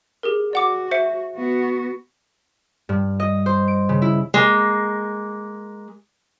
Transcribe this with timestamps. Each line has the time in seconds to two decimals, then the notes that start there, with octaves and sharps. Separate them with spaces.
0.23 G4 G#4 A#4
0.53 F#4 D5 F#5 D6
0.91 C5 E5 C#7
1.36 B3 F#4
2.89 G2
3.20 D#5
3.46 C5
3.68 D7
3.89 C#3
4.02 E4
4.34 G#3 A#3